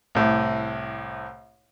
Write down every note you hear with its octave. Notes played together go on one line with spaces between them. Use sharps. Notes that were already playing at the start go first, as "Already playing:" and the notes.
C2 A2